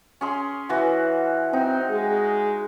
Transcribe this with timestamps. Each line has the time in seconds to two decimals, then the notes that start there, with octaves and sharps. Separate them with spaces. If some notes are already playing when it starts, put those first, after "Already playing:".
0.21 C#4 G#4 C6
0.69 E3 F#4
1.53 C4 D#4
1.90 G#3